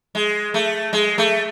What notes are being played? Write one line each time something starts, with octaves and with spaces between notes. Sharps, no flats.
G#3
A3
G#3
A3